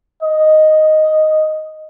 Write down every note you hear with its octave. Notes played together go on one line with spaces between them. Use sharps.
D#5